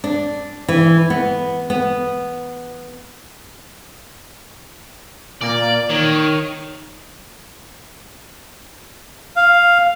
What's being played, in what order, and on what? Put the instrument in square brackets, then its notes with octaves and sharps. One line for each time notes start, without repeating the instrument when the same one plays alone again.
[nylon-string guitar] D4
E3
B3
B3
[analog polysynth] A#2 A#3 [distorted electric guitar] D5
[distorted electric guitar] D#3 [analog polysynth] C#5
[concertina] F5